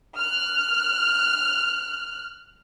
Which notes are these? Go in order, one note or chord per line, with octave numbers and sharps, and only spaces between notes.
F6 F#6